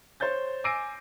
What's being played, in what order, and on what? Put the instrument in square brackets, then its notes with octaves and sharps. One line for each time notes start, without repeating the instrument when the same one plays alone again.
[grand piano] C5 C#5 G6 A6
G#5 D6 E6 A#6 C7 D7